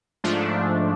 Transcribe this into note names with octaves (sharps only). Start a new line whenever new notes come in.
G#2 F3 A3 D4 F4